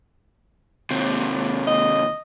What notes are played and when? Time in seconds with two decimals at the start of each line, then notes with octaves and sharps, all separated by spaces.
0.90 D#2 C3
1.67 D#5